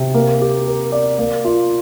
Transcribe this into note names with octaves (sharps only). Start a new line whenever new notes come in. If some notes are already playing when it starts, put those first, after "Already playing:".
Already playing: C3
A#3
G4
A#4
D5
A#3
F4